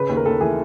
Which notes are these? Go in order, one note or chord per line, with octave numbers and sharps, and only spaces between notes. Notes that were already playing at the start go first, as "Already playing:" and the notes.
Already playing: C#3 B4
D#2
A#4
D#2 A4
E3 G#4